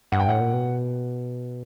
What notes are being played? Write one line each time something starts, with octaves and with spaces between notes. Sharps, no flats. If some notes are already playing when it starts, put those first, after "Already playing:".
G2 F#5
G5
A2 F#5
A#2
B2